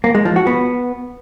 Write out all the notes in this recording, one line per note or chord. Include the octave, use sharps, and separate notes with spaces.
A#3
G#3
F3
F#4
B3